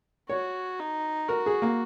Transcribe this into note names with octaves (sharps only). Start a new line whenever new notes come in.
F#4 C#5
D#4
F#4 A#4
G#4
A#3